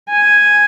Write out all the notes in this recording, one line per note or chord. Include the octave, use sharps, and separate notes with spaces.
G#5